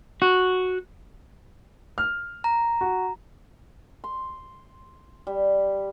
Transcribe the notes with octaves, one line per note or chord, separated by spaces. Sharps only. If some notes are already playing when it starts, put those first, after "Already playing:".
F#4
F6
A#5
F#4
C6
G3